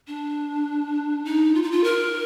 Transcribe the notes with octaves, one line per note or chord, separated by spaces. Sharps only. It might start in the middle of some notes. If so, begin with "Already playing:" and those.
D4
D#4
F4
D#4
F4
A#4